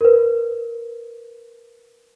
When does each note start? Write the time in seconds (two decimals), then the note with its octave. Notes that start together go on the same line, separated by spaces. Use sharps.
0.01 A#4 B4